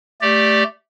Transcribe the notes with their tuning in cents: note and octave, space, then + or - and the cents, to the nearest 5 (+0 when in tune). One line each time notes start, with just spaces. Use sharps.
A3 +0 G4 +0 D5 +0